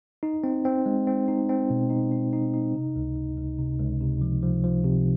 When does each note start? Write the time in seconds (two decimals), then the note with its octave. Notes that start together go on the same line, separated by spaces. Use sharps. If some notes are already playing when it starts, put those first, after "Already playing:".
0.23 D#4
0.44 C4
0.65 C4
0.86 G#3
1.07 C4
1.28 D#4
1.49 C4
1.70 B2
1.90 D#4
2.12 D#4
2.33 D#4
2.54 D#4
2.74 C3
2.96 C#2
3.16 C#2
3.37 C#2
3.59 C3
3.80 C#2
4.01 C3
4.21 F3
4.43 F3
4.64 F3
4.84 C3